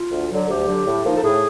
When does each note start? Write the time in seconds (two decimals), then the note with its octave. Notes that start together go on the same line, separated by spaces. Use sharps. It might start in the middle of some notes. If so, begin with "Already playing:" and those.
Already playing: F4
0.11 D2
0.30 D3 F#3
0.48 D2 G4
0.66 D3 F#3
0.85 A2
1.03 F3 A#3 D#4
1.16 A4
1.22 A2 G#4